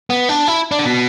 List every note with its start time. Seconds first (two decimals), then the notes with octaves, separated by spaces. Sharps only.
0.10 B3
0.29 D4
0.48 E4
0.71 D4
0.79 D3
0.85 B2